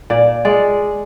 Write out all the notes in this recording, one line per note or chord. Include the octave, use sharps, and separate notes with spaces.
A#2 D5
G#3 D5